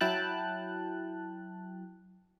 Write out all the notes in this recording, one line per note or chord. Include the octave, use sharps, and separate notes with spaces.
F#3 E4 G5 A5 F#6